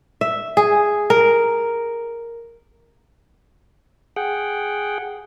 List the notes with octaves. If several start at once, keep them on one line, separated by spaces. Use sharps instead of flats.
E5
G#4
A#4
G#4 F#5 G5